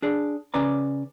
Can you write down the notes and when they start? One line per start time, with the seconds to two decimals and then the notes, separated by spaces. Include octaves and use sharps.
0.02 D4 G#4 D5
0.54 C#3 C#4 B4 D5 A#5